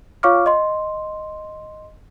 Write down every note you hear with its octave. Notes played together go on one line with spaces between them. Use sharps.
F4 C#5 F5 C#6 D6 F6
D#5 C6